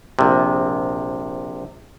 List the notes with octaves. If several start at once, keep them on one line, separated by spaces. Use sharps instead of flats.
A#1 C3